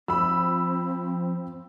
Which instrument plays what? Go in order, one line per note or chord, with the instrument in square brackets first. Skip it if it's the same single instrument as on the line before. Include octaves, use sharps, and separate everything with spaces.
[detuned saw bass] F3 [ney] C4 [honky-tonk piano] B5 E6